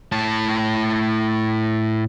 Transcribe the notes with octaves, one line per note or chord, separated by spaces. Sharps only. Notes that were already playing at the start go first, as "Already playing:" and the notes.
A2 A5